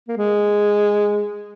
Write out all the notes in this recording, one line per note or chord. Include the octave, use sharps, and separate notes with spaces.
A#3
G#3